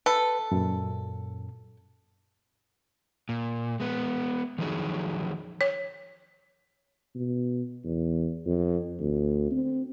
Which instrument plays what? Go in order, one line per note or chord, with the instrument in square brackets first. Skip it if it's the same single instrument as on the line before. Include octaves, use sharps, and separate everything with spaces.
[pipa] A4 [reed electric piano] B4
[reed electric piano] F#2 A#2
[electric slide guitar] A#2
G#3 B3
D#3 F3 F#3 D#4 F#4 G#4
[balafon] C#5
[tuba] B2
E2
F2
D2
C4